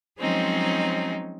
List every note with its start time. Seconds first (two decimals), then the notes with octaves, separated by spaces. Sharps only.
0.17 F3 F#3 G#3 C4 C#4 D#4